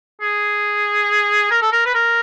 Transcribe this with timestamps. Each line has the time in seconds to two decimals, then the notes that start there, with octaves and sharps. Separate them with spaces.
0.21 G#4
1.51 A#4
1.62 A4
1.72 A#4
1.86 B4
1.95 A#4